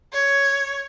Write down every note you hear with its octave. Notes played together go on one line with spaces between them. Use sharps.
C#5